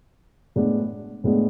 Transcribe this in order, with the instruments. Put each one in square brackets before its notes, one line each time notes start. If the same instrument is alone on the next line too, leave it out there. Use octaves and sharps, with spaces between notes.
[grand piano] A2 G#3 B3 D4
A2 G#3 B3 D4